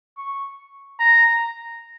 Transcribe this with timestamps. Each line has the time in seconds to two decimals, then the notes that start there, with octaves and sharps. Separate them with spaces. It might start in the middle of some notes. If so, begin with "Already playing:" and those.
0.17 C#6
1.00 A#5